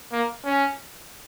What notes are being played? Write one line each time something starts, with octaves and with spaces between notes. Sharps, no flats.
A#3
C#4